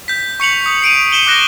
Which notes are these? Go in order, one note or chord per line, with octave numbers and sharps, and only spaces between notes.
G6 B6
C#6 C#7 F7 F#7
D#6
C7 D7 D#7 F7
C7 D#7 E7 F#7 G7
D6 F#6 A#6 G7